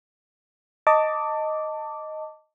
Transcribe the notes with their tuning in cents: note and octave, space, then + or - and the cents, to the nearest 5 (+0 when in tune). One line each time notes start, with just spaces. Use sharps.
D#5 +0 A5 +20 D6 -10